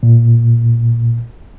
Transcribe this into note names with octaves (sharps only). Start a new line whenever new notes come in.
A#2